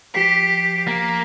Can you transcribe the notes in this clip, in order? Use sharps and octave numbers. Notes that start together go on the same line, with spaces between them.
F3 G4 B6 C7
A#3